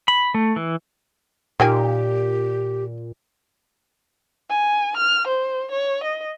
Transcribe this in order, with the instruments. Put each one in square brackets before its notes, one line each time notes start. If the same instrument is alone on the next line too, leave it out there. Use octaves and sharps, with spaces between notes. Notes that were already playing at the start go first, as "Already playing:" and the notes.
[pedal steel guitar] B5
A3
E3
[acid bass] A#2 [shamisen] D#3 G5 G#5 [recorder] G4
[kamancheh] G#5
F6
C5
C#5
D#5